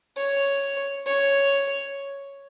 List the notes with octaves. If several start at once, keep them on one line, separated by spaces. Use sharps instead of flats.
C#5
C#5